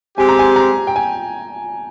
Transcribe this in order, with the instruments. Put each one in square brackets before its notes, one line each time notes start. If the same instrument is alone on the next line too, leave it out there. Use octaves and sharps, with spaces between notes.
[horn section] G#3 C4 G4 [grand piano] G#5
[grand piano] A#5
G#5
A#5
G5
G#5